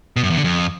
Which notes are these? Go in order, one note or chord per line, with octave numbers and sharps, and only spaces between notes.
B2
F#2
E2
D3
F2